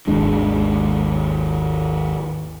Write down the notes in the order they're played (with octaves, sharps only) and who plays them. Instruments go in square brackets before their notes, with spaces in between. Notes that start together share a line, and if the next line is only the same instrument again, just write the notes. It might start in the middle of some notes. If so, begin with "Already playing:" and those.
[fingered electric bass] G#1 D#2 G#3 D4